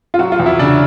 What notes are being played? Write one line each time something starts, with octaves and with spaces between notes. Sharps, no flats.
F4
F#3 F#4
F4
E2
E4
C#3 D4